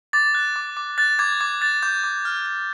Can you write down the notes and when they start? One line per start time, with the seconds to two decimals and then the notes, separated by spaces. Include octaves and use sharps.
0.13 D6 A6
0.35 F#6
0.56 D6
0.77 D6
0.98 F#6 A6
1.19 D6 G#6
1.40 D6 G#6
1.61 F#6 A6
1.83 D6 G6
2.04 D6
2.25 F6
2.46 F6